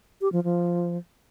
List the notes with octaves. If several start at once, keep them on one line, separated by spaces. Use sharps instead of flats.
G4
F3
F3